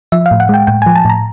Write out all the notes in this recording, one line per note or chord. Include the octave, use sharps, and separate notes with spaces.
F3 E5
F5
A2
F#5
G#3 G5
A2 G5
F3 G#5
A5
A2 A#5